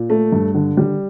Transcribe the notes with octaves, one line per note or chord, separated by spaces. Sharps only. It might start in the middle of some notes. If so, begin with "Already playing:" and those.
Already playing: A#2
A3
G2
D3
G3